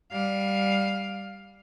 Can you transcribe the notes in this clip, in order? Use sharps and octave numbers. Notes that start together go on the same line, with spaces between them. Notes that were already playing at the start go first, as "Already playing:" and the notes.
G3 F5